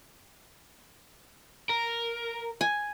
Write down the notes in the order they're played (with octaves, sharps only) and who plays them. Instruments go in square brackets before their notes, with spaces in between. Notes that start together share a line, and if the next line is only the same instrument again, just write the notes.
[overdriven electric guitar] A#4
[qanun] G#5